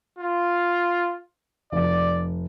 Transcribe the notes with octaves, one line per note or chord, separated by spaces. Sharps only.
F4
F1 D5